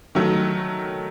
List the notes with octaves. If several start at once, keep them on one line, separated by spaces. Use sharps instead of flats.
D#3 F#3 A3